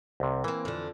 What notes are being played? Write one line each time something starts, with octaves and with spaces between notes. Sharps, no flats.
C2 C3
E3 A#3 C4
F2 D3